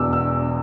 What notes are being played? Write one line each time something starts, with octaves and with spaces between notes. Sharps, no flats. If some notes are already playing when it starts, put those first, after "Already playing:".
Already playing: E1 E2 B2 D6 E6
E6